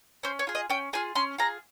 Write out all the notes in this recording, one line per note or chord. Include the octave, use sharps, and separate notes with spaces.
C#4 C5
C#5
F4 G#4
D#5
C#4 G5
F4 G#4 G#5
C#4 C6
F4 G#4 A#5